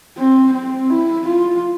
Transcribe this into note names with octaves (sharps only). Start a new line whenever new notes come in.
C4
C4
E4
F4